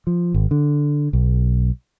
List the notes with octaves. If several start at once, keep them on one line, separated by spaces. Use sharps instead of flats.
F3
G#1
D3
B1